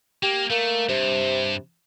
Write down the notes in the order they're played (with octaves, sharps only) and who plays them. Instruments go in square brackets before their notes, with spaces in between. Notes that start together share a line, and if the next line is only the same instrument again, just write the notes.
[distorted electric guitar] A#3 [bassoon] G4
[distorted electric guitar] A3 [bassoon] A#3
[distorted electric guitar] G2 [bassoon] C3